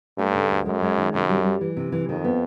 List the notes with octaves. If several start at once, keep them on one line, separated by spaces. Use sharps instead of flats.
G2 A3
C#3
D2
F#2 G#3
G#3
D#3
F#2 C3
G3
G3
E3
C3
E3
F2 D#3
B3